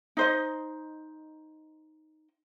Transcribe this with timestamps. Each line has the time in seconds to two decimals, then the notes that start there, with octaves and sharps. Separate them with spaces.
0.17 D#4 C5 D#5